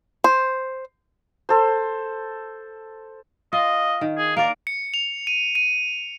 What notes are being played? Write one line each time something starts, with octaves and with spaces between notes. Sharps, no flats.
C5
A4 C5
F4 D#5
D#3
G#4
A#3 A#4 D5
C#7
F7
D#7
D#7